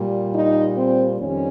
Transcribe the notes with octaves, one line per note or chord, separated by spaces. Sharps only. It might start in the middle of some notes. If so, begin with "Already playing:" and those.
Already playing: A#2 G3
D#4
C4
F2 D#3 G3 C#4